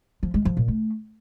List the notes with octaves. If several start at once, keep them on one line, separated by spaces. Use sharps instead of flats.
F3
G#3
F3
A#2
A3